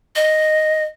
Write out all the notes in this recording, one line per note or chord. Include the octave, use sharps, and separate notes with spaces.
D#5